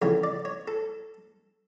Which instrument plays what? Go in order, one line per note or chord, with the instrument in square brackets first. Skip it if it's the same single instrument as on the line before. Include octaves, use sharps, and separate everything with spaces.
[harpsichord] F2 C#3 E3 A3 C#5
D5
C#5
A4